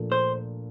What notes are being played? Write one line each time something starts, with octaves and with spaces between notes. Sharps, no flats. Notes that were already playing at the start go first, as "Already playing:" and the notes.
Already playing: A#2 F3 A3 D4
C5